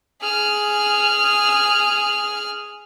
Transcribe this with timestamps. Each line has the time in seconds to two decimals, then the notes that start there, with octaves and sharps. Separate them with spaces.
0.21 G#4 F6